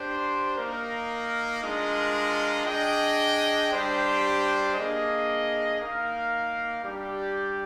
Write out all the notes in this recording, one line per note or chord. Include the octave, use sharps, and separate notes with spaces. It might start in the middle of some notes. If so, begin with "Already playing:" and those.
Already playing: D4 G4 C5
A#3 D#4 A#4
G#3 D4 F4 A#4 D#5
D4 G#4 D#5 G5
G3 D4 G4 C5
A#3 D4 G#4 D#5
A#3 D#4 A#4 F5
G3 D4 G4 D5